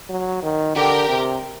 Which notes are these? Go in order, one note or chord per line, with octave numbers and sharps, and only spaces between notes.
F#3
D#3
D3 G4 A#4
C3